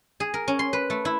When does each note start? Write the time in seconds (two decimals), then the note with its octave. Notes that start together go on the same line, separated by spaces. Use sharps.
0.20 G#4
0.34 A#4
0.48 C#4
0.59 C6
0.73 B4
0.90 A3
1.05 E4